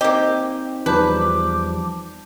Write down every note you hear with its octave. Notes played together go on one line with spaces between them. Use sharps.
A#3 C4 D#4 G4 D#5
E2 F3 G3 D#4 B4 A5 D6 G6